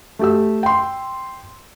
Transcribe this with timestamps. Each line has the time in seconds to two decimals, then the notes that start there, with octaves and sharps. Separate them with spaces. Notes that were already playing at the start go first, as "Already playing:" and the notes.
0.19 A3 G4 E6
0.63 G5 C6